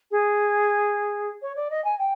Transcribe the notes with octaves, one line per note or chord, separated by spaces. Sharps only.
G#4
C#5
D5
D#5
G#5
G5